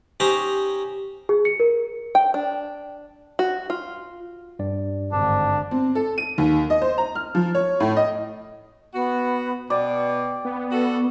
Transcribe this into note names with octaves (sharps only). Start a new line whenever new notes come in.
C#4 D#4 G4 C5 A#5
G#4
C#7
A#4
G5
D4
F#4
F4
G2 D5
G#1 D3 D4
C4
A4
D#7
D#2
D#5
C5
A#5
F6
F3
C#5
A2
D#5
B3 F#4
B2 D5 G5
B3
F#4 A4